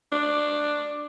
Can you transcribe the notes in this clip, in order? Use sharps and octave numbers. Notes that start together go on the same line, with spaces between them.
D4